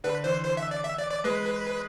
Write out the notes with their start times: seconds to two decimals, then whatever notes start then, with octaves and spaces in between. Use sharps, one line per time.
0.04 D3 B4
0.24 E3 C5
0.45 C5
0.57 E5
0.71 D5
0.84 E5
0.98 D5
1.11 D5
1.24 G#3 B4